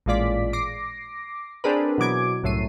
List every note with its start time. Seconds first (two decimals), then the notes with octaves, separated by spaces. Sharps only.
0.06 A1 A#2 G#3 F4 D5 B6
0.53 D6 A#6 C7
1.64 C4 D4 G#4 A#4 B4
1.98 B2 E3 F#3 D6 G#6 D7
2.43 C2 F#2 A2 A3 C7 D#7